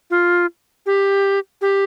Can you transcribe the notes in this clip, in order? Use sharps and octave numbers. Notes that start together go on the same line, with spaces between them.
F4
G4
G4